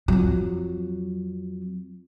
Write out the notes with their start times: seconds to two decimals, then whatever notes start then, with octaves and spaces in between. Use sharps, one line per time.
0.08 F2 F#3